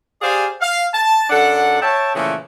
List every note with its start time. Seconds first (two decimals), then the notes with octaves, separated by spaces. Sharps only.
0.22 G4 G#4 C5 D5 F5 G#5
0.61 F5
0.93 A5
1.30 F#2 D4 A4 F#5
1.81 C#5 E5 G5 A5
2.15 A#2 C#3 E3 F3 A3